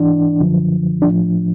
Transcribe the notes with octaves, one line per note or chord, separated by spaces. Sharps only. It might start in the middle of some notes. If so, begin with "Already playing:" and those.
Already playing: G#2 E3 D4
F#2 D3 F3
A2 F3 D4